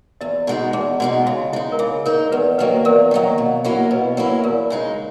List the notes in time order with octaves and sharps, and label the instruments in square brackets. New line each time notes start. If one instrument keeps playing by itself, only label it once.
[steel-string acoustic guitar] E2 [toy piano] D#5
[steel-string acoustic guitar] B2 G#3 D#4
[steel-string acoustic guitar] E2 [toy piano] G#4
[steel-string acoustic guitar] B2 G#3 D#4 [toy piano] F#4
[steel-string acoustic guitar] C#3 [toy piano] F#4
[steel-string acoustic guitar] G#3 D#4 [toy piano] E4
[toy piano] A#4
[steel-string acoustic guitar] C#3 [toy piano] G#4
[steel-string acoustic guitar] G#3 D#4 [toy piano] A#4
[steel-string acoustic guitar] E2 [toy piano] B4
[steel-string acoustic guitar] D#3 F#3 A#3 [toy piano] B4
[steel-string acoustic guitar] E2 [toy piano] A#4
[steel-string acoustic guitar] D#3 F#3 A#3
B2
F#3 A#3 C#4 E4
[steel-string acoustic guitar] B2 [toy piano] B4
[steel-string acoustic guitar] F#3 A#3 C#4 E4
[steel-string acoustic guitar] E2 [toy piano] A#4
[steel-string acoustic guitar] C#3 G#3 D#4